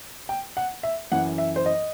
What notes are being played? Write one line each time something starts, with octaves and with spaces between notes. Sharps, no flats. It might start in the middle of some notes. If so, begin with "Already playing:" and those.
G5
F#5
E5
F#2 E3 F#5
E5
C5
D#5